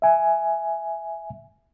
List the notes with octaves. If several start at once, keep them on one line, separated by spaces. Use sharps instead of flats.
E5 G#5